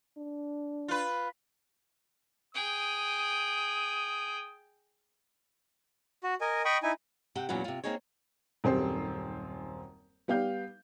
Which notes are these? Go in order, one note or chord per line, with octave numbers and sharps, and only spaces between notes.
D4
F4 B4
G#4 G5 D#6
F#4
A#4 D#5 G#5
D#5 G5 B5 C#6 D#6
D#4 E4 G#5
C3 G4 F#5 G5
E2 A#2 F#3 C#4 B4 F#5
C3 F4
A#3 C4 D#4 G#4 C#5
D#1 F#2 C4 G4 C5
G3 B3 G4 F5 G6